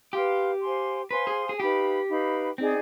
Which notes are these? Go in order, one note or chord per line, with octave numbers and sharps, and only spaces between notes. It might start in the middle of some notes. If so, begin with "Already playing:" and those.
G4 B4 F5 C6
C5 F5 G#5 C6
B4 C5 F5 G#5 C6
G#4
G#4
D#4 G4 B4 F5 B5
D#4 B4 F5 B5
C4 D#4 G#4 D5